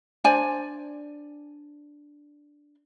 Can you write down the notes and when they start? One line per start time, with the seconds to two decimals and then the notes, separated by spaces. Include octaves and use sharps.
0.24 D4 C5 D5 G#5